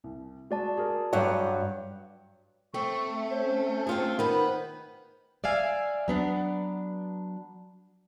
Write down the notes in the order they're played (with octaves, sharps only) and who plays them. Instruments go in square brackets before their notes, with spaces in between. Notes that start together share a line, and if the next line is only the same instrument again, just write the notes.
[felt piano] C2
[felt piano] G#3 [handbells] F#4 D5 A5
[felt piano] G#4 A#4
[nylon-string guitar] G2 F#3 F#5 [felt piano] C#5 F5 D6
[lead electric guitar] A3 [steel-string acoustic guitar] C4 [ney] C#6
[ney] E5
[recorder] C5 [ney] C#5
[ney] C#4
[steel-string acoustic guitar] C4 F4 G#4
[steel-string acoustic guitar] D#3 B3 [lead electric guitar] B4 [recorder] C5 [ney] B5
[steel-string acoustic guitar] D5 E5 F5 G#5
F#3 B3 D4